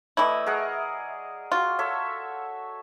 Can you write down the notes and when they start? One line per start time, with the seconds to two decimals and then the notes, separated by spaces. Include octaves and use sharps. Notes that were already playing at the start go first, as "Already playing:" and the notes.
0.17 E3 A3 E4 D5 D#5
0.46 G#4 A#4 F#5
1.52 F4 F#4
1.79 A4 C#5 E5